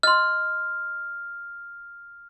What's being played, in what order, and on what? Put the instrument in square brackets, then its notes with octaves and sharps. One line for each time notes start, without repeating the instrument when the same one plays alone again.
[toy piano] D#5 C6 [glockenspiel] F6